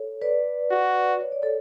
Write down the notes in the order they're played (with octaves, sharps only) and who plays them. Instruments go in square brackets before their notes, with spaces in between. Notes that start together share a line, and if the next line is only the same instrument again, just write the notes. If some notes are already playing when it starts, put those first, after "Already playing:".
Already playing: [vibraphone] A4 C#5
B4 D5
[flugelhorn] F#4
[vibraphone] C#5
D5
A4 C#5